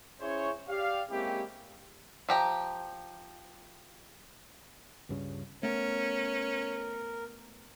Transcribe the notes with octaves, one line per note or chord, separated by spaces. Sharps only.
C#4 E4 G#4 C5 C#5
G4 D5 F5
G#3 A#3 C4 C#4 E4 G4
F3 G4 A#5
C#2 G2 C#3
A3 B3 C#4 A#4